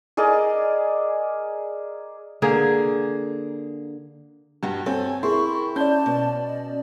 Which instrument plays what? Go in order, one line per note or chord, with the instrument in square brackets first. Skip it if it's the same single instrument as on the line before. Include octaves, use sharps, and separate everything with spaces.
[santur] G#4 A#4 D5 D#5
[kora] D3 A#3 G#4
[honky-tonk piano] G2 [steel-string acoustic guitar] F#4 G4
[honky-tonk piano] C4 [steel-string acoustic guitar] A4 C#5 [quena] G#5
[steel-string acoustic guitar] E4 [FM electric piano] G#4 A#4 C6 [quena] C#6
[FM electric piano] C#4 D5 [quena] A5 [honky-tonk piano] G6
[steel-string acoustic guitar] B2
[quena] D#5